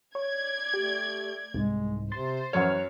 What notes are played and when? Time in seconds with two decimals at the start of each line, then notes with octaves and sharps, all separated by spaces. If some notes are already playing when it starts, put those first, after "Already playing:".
0.15 C#5 D5 G#6
0.74 A3 G4
1.54 C2 G#2 G#3
2.12 C3 C5 C6 A6
2.53 F#2 E3 C#5 F#5 F6